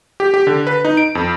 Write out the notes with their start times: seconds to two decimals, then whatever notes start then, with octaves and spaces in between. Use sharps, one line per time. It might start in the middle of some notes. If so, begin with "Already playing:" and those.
0.20 G4
0.34 G4
0.47 D3
0.67 B4
0.85 D#4
0.97 D7
1.15 F2